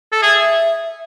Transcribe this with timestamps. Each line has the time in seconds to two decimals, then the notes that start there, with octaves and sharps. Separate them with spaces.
0.12 A4
0.22 G#4 E5